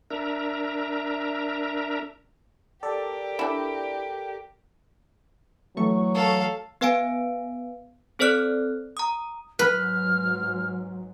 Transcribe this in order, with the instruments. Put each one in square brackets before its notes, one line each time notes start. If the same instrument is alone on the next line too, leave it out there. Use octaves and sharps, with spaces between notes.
[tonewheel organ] D4 A#4 E5 A#5
[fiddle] G4 A#4 [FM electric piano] A4 D5
[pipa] D4 E4
[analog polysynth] E3 A3 C#6 [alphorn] F#3
[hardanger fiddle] A4 F5
[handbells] B3 B4 F5 G#5 D7
C4 A4 C5 D5 F6 F#6
A#5 D#6
[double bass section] G#2 F#3 [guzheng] B4 [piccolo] F6